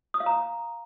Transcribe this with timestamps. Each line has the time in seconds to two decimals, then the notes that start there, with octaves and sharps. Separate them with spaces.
0.14 D#6
0.20 F5
0.26 A#5